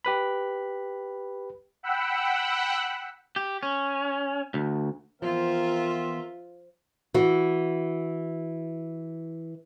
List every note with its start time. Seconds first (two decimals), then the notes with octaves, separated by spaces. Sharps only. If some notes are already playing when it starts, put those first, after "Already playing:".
0.05 G4 B4 B5
1.83 F#5 G5 B5 E6 F#6
3.36 G4
3.63 C#4
4.54 D2
5.22 E3 F3 B3 C4 F4 A#4 E5 C6
7.14 E3 F#4